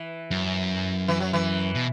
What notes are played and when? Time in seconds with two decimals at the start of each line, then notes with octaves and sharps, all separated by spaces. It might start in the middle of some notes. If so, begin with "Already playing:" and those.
Already playing: E3
0.31 F#2
1.08 E3
1.20 F#3
1.33 E3
1.75 B2